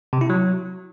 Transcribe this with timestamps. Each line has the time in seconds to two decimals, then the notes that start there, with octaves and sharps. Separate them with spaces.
0.13 C3
0.21 E4
0.30 F#3